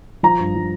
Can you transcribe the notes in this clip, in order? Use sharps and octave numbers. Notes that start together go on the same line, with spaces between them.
F3 A#5
G2
F3